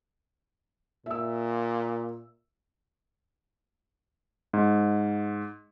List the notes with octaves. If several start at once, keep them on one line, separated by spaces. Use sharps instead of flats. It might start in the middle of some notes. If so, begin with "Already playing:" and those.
A#2 E5 E6
G#2